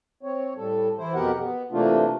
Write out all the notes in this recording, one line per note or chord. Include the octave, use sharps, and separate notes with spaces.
C4 C#5
A2 G3 A4
E3 E4 C5
F2 B2 B3 G4 A#4 F#5
B3
C3 E3 A3 A#3 D4 F4